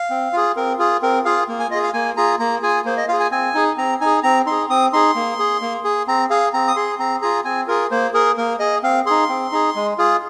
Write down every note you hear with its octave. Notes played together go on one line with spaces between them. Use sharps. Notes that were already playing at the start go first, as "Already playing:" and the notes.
Already playing: F5
C4
F4 G#4
C4 A#4
F4 G#4
C4 A#4
F4 G#4 F5
A#3
G#5
F4 G#4 D#5
F5
A#3 G#5
F4 G#4 A#5
A#3 A#5
F4 G#4 G#5
A#3 C5
D#5
F4 G#4 F5
G#5
C4 G#5
D#4 G#4
C4 A#5
D#4 G#4 G#5
C4 A#5
D#4 G#4 C6
C4 D#6
D#4 G#4 C6
A#3
G#4
A#3
G#4
C4 A#5
G#4 F5
C4 A#5
D#6
G#4 C6
C4 A#5
F4 G#4 A#5
C4 G#5
F4 G#4 A#4
A#3 C5
G#4 A#4
A#3 A#4
G#4 D#5
C4 F5
D#4 G#4 C6
C4
D#4 G#4
G#3
F4 G#4